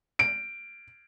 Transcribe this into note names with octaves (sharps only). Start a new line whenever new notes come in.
D7